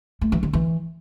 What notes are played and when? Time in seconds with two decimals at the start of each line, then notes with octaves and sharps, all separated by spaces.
0.21 A3
0.32 E3
0.43 D#3
0.53 E3